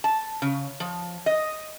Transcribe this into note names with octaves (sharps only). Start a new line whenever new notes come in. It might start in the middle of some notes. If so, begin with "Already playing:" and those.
A5
C#3
F3
D#5